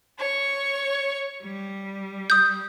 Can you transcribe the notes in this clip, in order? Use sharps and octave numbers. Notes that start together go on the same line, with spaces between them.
C#5 C#6
G3
D#6 G6